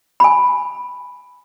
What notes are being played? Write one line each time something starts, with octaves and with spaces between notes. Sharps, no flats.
G#5 B5